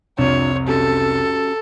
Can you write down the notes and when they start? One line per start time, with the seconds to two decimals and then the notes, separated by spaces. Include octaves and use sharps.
0.18 C2 F2 C3 D4 F4 C#5
0.68 C#4 F#4 G4 A4